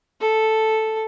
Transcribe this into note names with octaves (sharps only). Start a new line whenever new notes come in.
A4